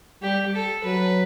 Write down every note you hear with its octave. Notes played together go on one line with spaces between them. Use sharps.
G3 G4
A4
F#3 B4